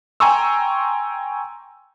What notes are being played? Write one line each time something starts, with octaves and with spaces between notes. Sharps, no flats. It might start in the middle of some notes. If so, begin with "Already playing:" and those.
G5 G#5 A#5 C6 C#6 E6